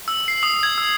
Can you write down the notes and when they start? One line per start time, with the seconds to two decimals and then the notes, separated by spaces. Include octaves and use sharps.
0.08 E6
0.28 C7
0.43 D#6
0.63 G#6
0.78 E6